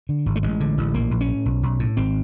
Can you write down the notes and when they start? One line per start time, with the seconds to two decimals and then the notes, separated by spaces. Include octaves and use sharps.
0.09 D3
0.26 G#1
0.36 A3
0.43 A1 G#3
0.60 D3
0.78 A1
0.94 A#1 A#3
1.11 A#1
1.21 C#4
1.28 A2
1.45 B1
1.63 B1
1.79 A2
1.97 G#1 C4